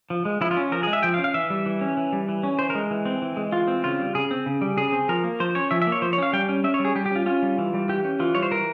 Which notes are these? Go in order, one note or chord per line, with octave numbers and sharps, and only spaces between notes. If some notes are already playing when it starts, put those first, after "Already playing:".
F3
G#3
F3 E4
F4
C#4
F3 A#4
G#3 G#4
E5
F3 G5
F5
C#4
F5
E3 E5
G3
E3
C#4
E3
G3
E3
C#4
E3 C5
A#4
G#3
E3
C4
E3
G#3
E3 F4
C4
C#3 F4
G3
C#3 G#4
C4
C#3
G3
C#3 G#4
C4
F3 A#4
A#3
F3 C5
C#4 C#5
F3 E5
E5
A#3
C#5
F3 C5
C#5
C#4 F5
G3 G5
C#4
C#4 E5
C#5
G3
G#4
G3 G4
G4
C#4 F4
C#4 F4
G3
E3
G3
E3 G4
C#4
E3 F4
G3 C#5
C5
E3 A#4